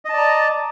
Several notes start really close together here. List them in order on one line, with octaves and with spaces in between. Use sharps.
D#5 A5 D5 A#5